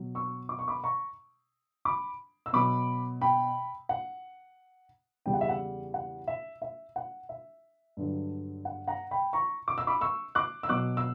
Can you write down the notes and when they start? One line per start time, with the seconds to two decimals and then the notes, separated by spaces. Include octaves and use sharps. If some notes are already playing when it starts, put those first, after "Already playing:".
Already playing: B2 F#3
0.15 C#6 E6
0.49 D6
0.59 C#6
0.68 B5 D6
0.84 A#5 C#6
1.85 B5 D6
2.46 E6
2.53 B2 F#3 B5 D6
3.21 G5 B5
3.89 F#5
5.26 E2 C#3 G3 G5
5.34 F#5
5.41 E5
5.49 F#5
5.94 F#5
6.28 E5
6.62 E5
6.96 F#5
7.29 E5
7.97 G2 D3 F#3
8.65 F#5
8.88 F#5 A#5
9.11 G5 B5
9.33 A#5 C#6
9.68 D6
9.78 E6
9.87 B5 D6
10.01 C#6 E6
10.35 D6 F#6
10.63 E6
10.69 B2 F#3 D6 F#6
10.97 E6